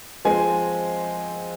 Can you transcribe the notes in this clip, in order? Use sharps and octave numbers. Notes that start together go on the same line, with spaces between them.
F3 G#3 C4 G#5